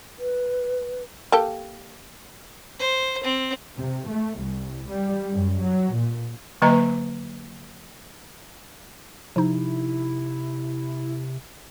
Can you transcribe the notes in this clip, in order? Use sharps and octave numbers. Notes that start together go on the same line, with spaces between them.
B4
A#3 G4 A4
C5
C4
C3
A3
C2
G3
F#2
F#3
A#2
D3 F#3 A#3 B4 D#5 A#5
C3 F3 D#4 E4